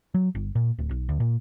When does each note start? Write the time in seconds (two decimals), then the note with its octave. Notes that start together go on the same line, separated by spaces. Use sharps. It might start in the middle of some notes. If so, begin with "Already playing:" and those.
0.14 F#3
0.35 G1
0.55 A#2
0.79 D1
0.91 B1
1.09 D2
1.20 A#2